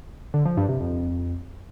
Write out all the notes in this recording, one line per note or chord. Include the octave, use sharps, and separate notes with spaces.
D3
F3
G2
C3
F2